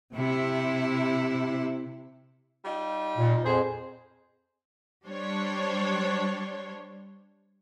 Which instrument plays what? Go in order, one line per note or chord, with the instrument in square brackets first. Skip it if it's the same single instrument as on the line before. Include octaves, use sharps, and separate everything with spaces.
[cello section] C3 E4
[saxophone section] G3 D#4 F4
[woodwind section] A#2
[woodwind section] F2 C5 [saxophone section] B3 G#4
[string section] G3 D4 C5 C#5